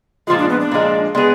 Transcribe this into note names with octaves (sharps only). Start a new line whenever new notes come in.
A#2 F3 G#3 F4
D4
B3
D4
A#2 F3 G#3
G#3 B3 D4 G#4